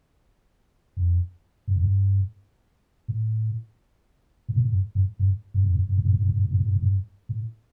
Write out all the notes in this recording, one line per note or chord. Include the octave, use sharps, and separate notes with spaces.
F2
G2
F2
G2
A2
A2
A#2
A2
G2
G2
G2
G2
F2
G2
G2
A2
G2
A2
G2
A2
G2
A2
G2
A2
G2
A2
G2
A2